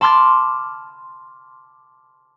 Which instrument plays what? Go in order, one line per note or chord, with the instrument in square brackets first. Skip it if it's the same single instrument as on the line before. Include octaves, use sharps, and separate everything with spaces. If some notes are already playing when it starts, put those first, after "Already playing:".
[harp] A5 B5 C6 D6 F6 A6